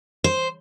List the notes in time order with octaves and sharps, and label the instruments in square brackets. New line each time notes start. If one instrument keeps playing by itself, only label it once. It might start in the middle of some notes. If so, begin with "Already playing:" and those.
[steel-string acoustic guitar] C5